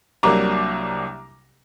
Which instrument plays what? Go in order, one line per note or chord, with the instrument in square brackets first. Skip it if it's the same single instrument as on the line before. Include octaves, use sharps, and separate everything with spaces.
[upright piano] C2 C3 F#3 A#3 D4 A#5 D6